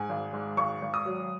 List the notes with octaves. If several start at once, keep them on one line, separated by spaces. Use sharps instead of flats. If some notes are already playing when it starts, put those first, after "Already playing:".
Already playing: G#2 G#5
G#1
G#2
G#1 C#6
G#1
D#6
F#3